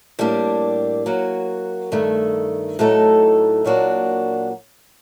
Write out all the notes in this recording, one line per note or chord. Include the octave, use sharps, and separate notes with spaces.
A2 G3 A#3 D4 G4
F#3 A#3 F#4
G2 D#3 A3
A2 F#3 A3 D#4 A4
A#2 F#3 A#3 D4 F#4